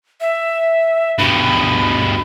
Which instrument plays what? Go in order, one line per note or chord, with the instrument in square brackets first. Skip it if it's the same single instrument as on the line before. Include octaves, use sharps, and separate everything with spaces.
[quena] E5
[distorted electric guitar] G2 B2 [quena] B5